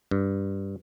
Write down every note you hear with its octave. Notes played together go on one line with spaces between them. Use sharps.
G2